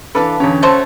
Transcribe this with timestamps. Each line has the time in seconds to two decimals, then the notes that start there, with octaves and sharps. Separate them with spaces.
0.15 E3 D4 A4 B4 F5 A5
0.40 E2 D3 C#4 C#5
0.63 A3 F#4 A4 C5 C#5 A5